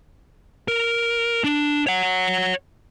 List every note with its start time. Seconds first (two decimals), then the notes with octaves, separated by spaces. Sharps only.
0.68 A#4
1.44 D4
1.87 C#5 F#5